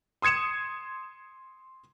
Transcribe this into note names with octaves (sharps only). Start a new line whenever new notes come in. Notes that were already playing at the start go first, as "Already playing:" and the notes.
C6 D#6 G#6 C#7 E7